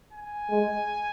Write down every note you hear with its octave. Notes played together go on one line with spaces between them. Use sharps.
G#5
G#3